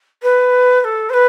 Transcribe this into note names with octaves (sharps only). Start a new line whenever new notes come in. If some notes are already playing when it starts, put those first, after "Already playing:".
B4
B4
A4
C5
B4